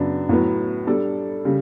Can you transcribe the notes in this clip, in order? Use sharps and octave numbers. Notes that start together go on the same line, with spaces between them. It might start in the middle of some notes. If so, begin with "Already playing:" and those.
Already playing: F#2 C#3 F#3 B3 D4
A2 F#3 B3
G3 D4 A4 D5
C#3 G3